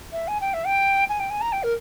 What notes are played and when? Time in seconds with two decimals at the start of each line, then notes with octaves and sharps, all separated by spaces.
0.12 E5
0.28 G#5
0.41 G5
0.54 E5
0.66 G5
1.09 G#5
1.20 G5
1.30 G#5
1.41 A#5
1.52 G5
1.63 A#4